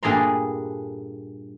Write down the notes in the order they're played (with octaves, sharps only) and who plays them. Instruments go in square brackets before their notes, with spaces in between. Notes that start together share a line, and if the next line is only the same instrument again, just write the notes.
[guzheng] G2 A#2 G#4 A4 A#5 C6